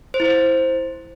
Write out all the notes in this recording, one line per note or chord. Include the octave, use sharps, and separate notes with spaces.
C5
E4
C5